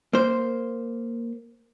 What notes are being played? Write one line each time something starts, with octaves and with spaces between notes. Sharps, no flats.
A#3 C5